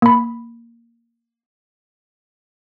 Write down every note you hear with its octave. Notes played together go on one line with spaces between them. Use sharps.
A#3 B5